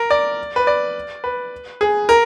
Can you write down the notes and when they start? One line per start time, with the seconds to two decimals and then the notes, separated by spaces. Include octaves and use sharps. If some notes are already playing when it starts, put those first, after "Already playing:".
Already playing: A#4
0.10 D5
0.56 B4
0.67 D5
1.24 B4
1.81 G#4
2.09 A#4